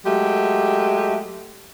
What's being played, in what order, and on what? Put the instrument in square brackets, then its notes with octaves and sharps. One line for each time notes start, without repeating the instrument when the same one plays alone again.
[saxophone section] F#3 G#3 A3 G4